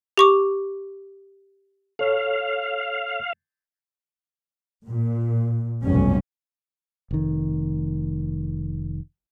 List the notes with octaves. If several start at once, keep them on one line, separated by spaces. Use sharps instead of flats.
G4 C#6 D6
A4 C#5 F5
A#2
F1 B1 G2 C#4
F1 D#3